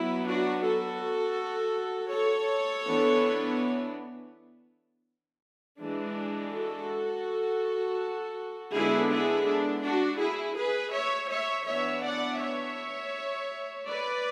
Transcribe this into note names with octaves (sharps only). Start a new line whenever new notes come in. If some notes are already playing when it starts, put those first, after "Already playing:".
Already playing: F#3 B3 E4
D4 F#4
F#4 A4
A4 C#5
E3 B3 D4
E3 G#3 D4
F#4 A4
D3 G#3 B3 D4 E4 G#4
E4 G#4
D4
D4 F#4
E4 G#4
G#4 B4
C#5 E5
C#5 E5
E3 B3 D4 C#5 E5
D5 F#5
C#5 E5
B4 D5